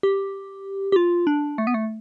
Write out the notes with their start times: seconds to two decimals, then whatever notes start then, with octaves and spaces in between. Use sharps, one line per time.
0.03 G4
0.92 G4
0.96 F4
1.27 D4
1.58 A3
1.67 B3
1.74 A3